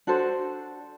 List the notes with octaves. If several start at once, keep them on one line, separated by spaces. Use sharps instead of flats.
D4 F#4 A4 C5